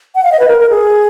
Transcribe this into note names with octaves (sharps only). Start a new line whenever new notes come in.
F#5
F5
D#5
B4
A#4
A#4
G#4